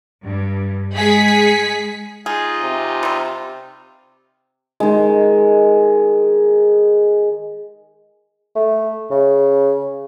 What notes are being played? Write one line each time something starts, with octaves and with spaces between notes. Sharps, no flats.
G2
G#3 G#4 B6 C#7
D#4 F4 G#4
C3
G3 C4
D#3 G#3
A3
C#3